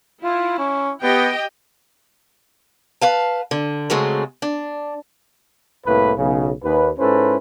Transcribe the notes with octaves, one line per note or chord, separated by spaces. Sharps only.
E4 F4
C#4
B3 G4 D#5 G5
B4 F5 A5
D3
C#3 F#3 G#3 A3 C4
D4
C2 A2 A#3 B4
B1 C#3
D#2 B4
G#2 C#4 E4 A4 B4 C5